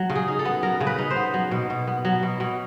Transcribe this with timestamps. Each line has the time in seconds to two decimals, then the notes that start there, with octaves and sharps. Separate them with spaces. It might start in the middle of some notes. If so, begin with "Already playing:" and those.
Already playing: F#3
0.10 C#3
0.15 G#4
0.28 D#4
0.39 A4
0.45 B3
0.63 F#3 A#4
0.81 C#3
0.87 B4
0.98 D#4
1.10 C5
1.16 B3
1.34 F#3
1.51 B2
1.70 B2
1.87 B3
2.05 F#3
2.23 B2
2.40 B2